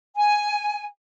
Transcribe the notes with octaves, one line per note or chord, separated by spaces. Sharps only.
G#5